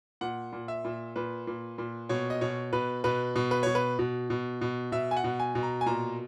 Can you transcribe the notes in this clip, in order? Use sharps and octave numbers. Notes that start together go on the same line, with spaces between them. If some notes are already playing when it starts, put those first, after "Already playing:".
A#2 F#5
A#2
E5
A#2
A#2 B4
A#2
A#2
B2 C#5
D#5
B2 C#5
B2 B4
B2 B4
B2
B4
B2 C#5
B4
B2
B2
B2
B2 E5
G#5
F#5
B2
G#5
B2
A#5
G#5
A#2 A#5